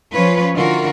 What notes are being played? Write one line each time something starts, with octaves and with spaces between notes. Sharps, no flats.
F3 C#4 F4 B4 C#5
D3 E3 F4 F#4 A#4